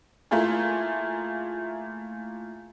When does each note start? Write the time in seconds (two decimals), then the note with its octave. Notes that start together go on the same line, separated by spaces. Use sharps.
0.31 A3 A#3 E4 F4 G#4